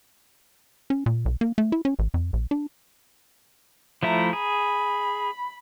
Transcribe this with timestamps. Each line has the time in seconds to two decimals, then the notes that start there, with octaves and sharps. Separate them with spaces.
0.90 C#4
1.06 A#2
1.25 B1
1.41 A#3
1.58 A3
1.72 E4
1.85 C#4
1.99 A1
2.14 F2
2.33 A#1
2.51 D4
4.03 F3 A3 E4 A#5
4.33 G#4 B5